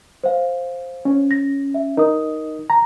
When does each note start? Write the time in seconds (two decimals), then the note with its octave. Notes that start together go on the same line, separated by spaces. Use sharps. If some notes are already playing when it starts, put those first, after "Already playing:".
0.24 C5 F5
1.05 C#4
1.31 A#6
1.74 E5
1.97 D#4 A#4 D#6
2.70 A#5